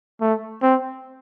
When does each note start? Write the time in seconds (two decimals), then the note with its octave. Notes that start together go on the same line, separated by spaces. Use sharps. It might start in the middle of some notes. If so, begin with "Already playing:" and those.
0.21 A3
0.63 C4